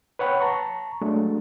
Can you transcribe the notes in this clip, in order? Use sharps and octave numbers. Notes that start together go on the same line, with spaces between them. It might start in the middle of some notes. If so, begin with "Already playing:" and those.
B4 C#5 F#5 G5 B5
A5 A#5 C#6
F#3 G#3 A3 D4